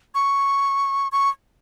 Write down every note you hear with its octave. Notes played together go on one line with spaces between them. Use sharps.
C#6
C#6